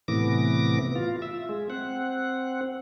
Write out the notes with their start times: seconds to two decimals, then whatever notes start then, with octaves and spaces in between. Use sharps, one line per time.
0.08 A2 C3 E3 B3 D6 A#6
0.96 F4
1.22 E5
1.49 G#3
1.70 C4 F#5